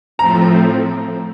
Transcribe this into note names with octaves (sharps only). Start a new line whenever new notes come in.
A2 F3 A3 C4 A#5